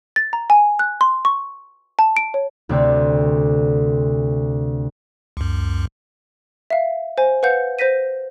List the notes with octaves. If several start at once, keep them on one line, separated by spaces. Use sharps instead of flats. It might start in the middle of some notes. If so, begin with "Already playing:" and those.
A6
A#5
G#5
F#6
C6
C#6
A5
D7
C#5
D2 C3 C4
C#2 F#2
E5 F5
C5 G#5
B4 F5 F#5 G6 C#7
C5 G6 A#6 B6 D#7